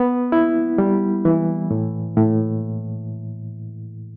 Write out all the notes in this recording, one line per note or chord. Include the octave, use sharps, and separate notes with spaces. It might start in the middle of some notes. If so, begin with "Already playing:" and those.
Already playing: B3
E4
G3
E3
A2
A2